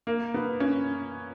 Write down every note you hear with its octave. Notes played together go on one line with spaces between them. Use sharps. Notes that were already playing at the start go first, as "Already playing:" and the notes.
A#3
B3
C#4